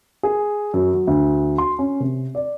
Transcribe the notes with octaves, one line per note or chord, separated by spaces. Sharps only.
G#4
F#2
F#3
D2
C6
C#4
C3
D5